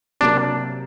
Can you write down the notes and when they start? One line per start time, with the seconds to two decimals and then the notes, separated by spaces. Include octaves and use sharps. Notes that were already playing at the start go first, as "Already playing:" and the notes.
0.21 C3 F#3 A#3 D4